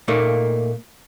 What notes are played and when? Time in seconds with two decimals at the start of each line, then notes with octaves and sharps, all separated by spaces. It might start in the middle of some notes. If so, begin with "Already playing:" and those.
0.08 A#2 A3 A#3 D#4